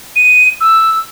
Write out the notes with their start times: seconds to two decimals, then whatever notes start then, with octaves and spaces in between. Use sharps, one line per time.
0.16 D#7
0.61 E6